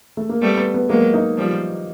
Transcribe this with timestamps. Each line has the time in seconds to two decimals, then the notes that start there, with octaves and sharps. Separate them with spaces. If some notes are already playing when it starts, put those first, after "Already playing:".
0.17 A3
0.29 A#3
0.42 G3 A3 B3
0.57 B3
0.74 B3
0.90 F#3 G#3 A#3
1.14 D#4
1.37 F3 G3